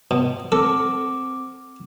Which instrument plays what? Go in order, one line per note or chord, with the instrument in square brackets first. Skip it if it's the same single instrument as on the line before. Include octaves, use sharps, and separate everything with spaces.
[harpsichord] B2
[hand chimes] C4 D6 [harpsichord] A4